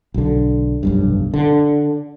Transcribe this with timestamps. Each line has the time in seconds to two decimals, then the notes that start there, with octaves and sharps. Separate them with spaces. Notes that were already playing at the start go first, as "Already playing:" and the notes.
0.14 B1 D3
0.83 F1 B1 G2
1.34 D3